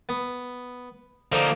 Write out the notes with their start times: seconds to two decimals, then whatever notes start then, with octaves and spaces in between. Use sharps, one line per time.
0.09 B3
1.32 D3 F3 A#3 D#4 C5